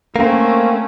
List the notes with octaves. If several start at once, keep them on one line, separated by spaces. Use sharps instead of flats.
A3 A#3 C4 C#4